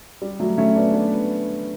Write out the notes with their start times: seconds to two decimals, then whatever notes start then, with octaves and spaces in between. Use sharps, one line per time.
0.22 G3
0.40 F#3 A3
0.58 A3 C#4
0.76 B3 D4
0.94 B3 D4